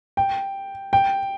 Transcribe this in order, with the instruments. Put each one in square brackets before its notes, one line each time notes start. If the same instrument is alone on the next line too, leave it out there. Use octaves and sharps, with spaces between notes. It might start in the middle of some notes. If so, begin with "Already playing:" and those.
[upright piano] G5
G5